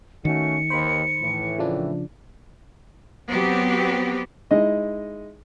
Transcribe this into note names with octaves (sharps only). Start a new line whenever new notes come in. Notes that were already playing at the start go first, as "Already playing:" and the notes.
D#3 A3 C#4 F#4 C#7
D#2 C5 B5
A2 E3
C#3 F3 D4
F#3 B3 C4 G4
G#3 D#4 E4 D#5